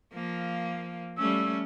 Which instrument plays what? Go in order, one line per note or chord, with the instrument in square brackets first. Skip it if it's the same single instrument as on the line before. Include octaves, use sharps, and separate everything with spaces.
[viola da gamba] F3 A#3
[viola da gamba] G3 A3 C#4 [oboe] E6